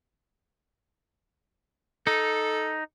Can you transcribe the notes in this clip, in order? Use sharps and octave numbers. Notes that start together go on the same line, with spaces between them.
D#4 A4